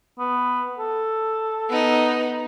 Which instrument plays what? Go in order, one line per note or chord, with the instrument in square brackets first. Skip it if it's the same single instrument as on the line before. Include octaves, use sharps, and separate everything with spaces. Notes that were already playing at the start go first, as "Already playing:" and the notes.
[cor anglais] B3
A4
[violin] B3 D#4